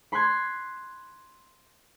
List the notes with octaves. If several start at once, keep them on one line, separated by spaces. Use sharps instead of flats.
B5 C6 F#6 G#6 C7